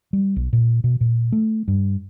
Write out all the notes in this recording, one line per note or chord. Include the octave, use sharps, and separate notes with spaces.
G3
B1
A#2
B2
A#2
A3
G2